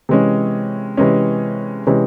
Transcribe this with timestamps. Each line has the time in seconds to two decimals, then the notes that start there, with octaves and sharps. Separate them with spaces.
0.09 C3 E3 G#3 C#4
0.97 C3 E3 G#3 C#4
1.87 C3 E3 G#3 C#4